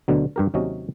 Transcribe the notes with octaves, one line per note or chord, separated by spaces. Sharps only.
D2 B2 D3 F#3
G2 G4 A#4
D#2 C3 F#3 C#4 D#5